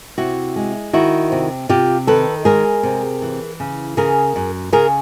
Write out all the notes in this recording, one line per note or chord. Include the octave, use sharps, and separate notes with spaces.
C3 E4 F#4
G#3
D#3 E4 F#4
C3
C3 F4 G4
D#3 A4 B4
G#3 G#4 A#4
C3
E3
C#3
C#3 G#4 A#4
F#2
C#3 G#4 A#4